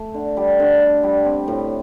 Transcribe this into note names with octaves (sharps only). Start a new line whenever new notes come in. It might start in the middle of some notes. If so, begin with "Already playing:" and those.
Already playing: A3
D3
G3
D3
D3
G3
C4
A2